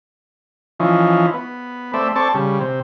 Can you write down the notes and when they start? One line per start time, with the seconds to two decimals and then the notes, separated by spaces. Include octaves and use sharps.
0.80 E3 F3 C#4 D#4
1.34 B3
1.94 A3 C4 D5 E5
2.16 C4 A4 D5 A5 C#6
2.35 C#3 G3
2.60 C3